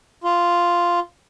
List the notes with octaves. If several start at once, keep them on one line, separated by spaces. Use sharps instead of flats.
F4